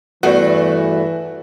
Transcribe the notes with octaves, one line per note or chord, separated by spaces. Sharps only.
E2 G2 E3 A3 F#4